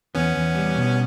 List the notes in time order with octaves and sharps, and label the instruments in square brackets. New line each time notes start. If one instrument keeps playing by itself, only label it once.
[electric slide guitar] E2 [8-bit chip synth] B3 C#4
[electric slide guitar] E2
G3
B2